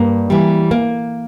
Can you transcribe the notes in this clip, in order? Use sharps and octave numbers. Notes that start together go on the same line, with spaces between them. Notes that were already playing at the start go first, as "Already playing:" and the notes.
Already playing: G2 A#3
E3 G3
A#3